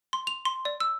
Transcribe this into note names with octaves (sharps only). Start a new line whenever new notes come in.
C6
F7
C6
D5
E6